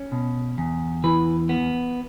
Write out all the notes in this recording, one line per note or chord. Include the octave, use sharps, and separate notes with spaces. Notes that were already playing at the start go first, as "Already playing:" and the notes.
Already playing: C#4
B2
E2
E3 B4
B3